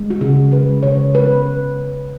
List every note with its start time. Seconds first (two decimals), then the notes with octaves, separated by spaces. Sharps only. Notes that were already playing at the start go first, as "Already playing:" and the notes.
Already playing: G#3
0.10 F#4
0.21 C#3 G#4
0.51 G#3 B4
0.83 C#3 C#5
1.14 G#3 B4